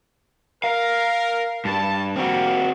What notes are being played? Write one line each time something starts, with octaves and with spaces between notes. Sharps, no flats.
A#4 F5
G2 A5
G3 A#3 C4 F#4